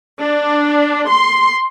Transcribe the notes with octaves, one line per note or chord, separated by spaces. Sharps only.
D4
C6